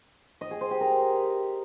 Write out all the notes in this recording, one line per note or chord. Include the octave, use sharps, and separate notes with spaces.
D#5
G#4
C5
G4
A#4